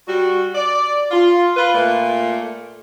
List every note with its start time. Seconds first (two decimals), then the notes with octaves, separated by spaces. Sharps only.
0.07 G3 F#4
0.54 D5
1.11 F4
1.57 F4 B4
1.73 A#2 A3